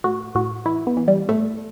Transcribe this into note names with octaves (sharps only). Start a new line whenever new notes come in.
A2 F#4
A2 F#4
E3 E4
B3
E3
G3
A2 A3